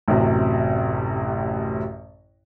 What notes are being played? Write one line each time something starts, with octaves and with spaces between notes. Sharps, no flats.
A1 F#2 C3